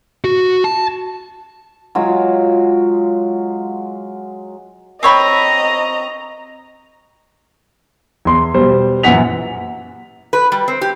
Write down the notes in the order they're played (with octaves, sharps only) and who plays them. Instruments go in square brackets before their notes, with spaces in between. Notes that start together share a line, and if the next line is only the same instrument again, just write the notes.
[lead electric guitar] F#4
A5
[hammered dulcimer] F#3 G#3 F4
[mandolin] C4 C#5 B5 [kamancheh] D#5 A#5
[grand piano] E2 C6
B2 G3 C5
F#2 A#2 E3 F#5 B6 F7
[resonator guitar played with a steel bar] B4
G3
C4
G4